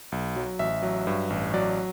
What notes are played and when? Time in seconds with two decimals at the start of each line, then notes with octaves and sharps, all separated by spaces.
0.12 B1
0.36 F#3
0.59 A1 E5
0.82 F#3
1.07 G2
1.30 A1
1.54 F#3 D5